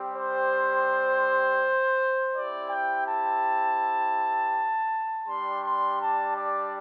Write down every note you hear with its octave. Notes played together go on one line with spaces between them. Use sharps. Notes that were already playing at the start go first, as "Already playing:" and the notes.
Already playing: G3 C4 G4
C5
C4 E4 G4 D5
G5
A5
G3 D4 G4 C6
C6
A5
D5